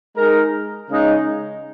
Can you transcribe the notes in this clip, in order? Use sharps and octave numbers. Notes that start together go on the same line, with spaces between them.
G#3 D#4 A#4
C#3 G#3 D#4